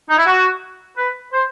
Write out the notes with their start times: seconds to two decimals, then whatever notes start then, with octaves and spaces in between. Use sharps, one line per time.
0.10 D#4
0.17 E4
0.26 F#4
0.97 B4
1.32 C5